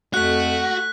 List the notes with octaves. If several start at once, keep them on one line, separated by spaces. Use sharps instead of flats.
F2 A3 F#4 F#6 B6